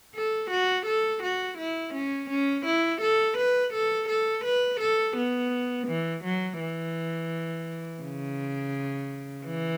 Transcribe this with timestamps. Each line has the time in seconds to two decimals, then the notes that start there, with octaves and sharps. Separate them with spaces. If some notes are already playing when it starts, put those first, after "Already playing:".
0.15 A4
0.50 F#4
0.86 A4
1.23 F#4
1.58 E4
1.94 C#4
2.30 C#4
2.66 E4
3.01 A4
3.37 B4
3.73 A4
4.09 A4
4.45 B4
4.80 A4
5.17 B3
5.87 E3
6.24 F#3
6.60 E3
8.03 C#3
9.46 E3